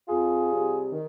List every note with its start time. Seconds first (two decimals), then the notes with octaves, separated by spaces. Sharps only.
0.08 F2 F4 G#4
0.51 C3 G3
0.92 D#3